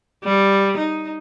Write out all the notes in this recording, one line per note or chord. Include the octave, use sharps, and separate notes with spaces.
G3
D#4